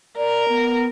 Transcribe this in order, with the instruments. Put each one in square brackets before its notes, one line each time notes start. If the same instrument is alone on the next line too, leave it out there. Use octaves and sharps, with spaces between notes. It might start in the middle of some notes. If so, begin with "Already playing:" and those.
[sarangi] A#4 [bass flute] D5
[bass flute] B3